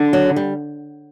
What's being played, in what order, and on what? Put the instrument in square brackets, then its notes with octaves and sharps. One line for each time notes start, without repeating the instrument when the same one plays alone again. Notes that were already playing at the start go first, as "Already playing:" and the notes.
Already playing: [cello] D3
[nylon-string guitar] F#3
G3